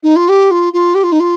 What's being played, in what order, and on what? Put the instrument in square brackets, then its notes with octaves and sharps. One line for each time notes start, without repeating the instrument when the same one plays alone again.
[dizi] D#4
F4
G4
F4
F4
G4
F4
D#4
F4